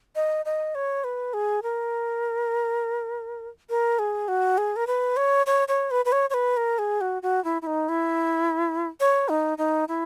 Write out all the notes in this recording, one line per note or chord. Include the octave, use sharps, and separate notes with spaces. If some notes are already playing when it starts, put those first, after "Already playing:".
D#5
D#5
C#5
B4
G#4
A#4
A#4
G#4
F#4
G#4
A#4
B4
C#5
C#5
C#5
B4
B4
C#5
C#5
B4
A#4
G#4
F#4
F#4
E4
E4
D#4
E4
C#5
D#4
D#4
E4